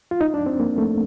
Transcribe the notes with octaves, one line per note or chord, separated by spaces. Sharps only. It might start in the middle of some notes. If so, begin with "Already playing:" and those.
F4
D#4
D4
C4
A#3
A3